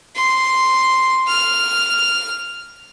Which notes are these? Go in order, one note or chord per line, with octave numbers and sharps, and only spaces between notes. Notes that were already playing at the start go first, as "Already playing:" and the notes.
C6
F6